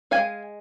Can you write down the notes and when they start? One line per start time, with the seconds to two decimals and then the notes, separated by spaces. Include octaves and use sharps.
0.11 G#3 D#4 F5 G#5